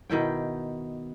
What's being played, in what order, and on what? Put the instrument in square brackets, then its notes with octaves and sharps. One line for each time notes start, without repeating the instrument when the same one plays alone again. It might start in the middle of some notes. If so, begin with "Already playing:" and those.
[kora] B2 D#3 E4 G5